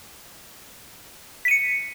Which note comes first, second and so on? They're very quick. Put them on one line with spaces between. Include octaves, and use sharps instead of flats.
B6 D#7 C#7